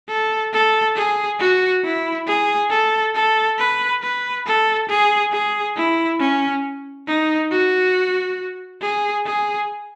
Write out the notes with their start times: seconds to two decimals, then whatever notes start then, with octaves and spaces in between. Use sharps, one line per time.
0.09 A4
0.53 A4
0.96 G#4
1.39 F#4
1.84 E4
2.27 G#4
2.70 A4
3.15 A4
3.58 B4
4.02 B4
4.46 A4
4.89 G#4
5.33 G#4
5.77 E4
6.20 C#4
7.07 D#4
7.51 F#4
8.82 G#4
9.26 G#4